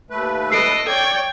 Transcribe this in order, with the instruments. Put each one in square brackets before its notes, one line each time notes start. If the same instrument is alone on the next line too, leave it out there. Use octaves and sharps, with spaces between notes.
[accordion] D#2 A3 B4
[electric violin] A4 D#5 [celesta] E6 C7 D7
[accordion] C#5 D5 [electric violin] G5 G#6